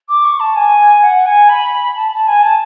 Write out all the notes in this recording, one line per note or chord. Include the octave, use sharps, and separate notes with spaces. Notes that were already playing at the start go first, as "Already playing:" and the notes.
D6
C#6
A5
G#5
F#5
G#5
B5
A5
A5
G#5
A5